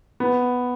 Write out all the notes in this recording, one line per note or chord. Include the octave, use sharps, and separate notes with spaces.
B3